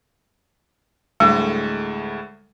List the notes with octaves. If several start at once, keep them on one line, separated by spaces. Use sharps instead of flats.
D2 A2 G3 G#3